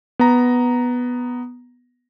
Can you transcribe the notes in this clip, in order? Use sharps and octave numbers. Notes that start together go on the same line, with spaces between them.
B3 A#5